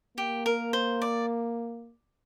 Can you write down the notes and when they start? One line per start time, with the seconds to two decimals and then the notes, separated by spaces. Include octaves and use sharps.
0.17 A#3 G4
0.46 A#4
0.73 C5
1.02 D5